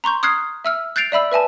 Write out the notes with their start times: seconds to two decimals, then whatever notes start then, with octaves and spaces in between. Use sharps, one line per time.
0.04 A#5 C6 C#6 G6
0.23 D#6 F6 F#6 G#6 C7
0.65 E5 E6 F6
0.96 F#6 G6 A6 C7 D7 F7
1.12 D5 E5 B5 E6
1.32 B4 E5 G#5 A5